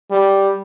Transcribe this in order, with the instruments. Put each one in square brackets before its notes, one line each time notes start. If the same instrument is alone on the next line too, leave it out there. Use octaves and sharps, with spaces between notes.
[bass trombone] G3